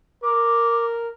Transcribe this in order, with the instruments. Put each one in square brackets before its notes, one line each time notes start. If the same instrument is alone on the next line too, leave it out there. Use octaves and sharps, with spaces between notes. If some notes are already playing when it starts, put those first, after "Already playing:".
[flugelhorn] A#4 [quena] D6